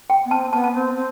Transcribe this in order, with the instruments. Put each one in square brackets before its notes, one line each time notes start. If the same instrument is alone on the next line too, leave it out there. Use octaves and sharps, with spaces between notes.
[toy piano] G5
[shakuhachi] B3
[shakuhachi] C4 [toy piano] A5
[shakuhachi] B3 [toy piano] A5
[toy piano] A5
[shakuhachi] C4
C4